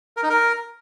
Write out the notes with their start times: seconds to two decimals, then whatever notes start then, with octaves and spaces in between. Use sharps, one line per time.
0.17 A#4
0.23 D#4
0.30 A#4